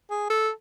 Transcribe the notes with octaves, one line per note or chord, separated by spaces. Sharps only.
G#4
A4